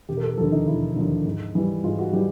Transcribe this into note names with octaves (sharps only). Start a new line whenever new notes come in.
E1 G4
A#4
A4
D#2 D3 F3 A4
D#4
E1 E4
D#2 D3 F3
G#2
E3 G3
G#2 F4
F#4
E3 G3 G4